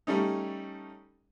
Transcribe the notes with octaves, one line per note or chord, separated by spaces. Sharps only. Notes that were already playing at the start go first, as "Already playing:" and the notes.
G3 A3 C#4 D#4